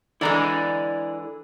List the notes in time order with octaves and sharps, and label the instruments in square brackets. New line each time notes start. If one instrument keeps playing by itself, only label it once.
[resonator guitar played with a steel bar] D3 E3 G#3 [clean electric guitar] E4 D5 A#5